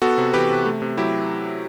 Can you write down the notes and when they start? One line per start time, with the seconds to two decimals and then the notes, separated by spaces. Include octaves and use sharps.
0.02 B3 F#4 A4
0.18 C3
0.33 E3 G4 B4
0.50 C3
0.66 A3
0.82 C3
0.97 F#3 E4 G4